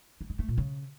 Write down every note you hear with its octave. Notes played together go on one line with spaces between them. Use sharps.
A#3
G#3
A3
A#2
C#3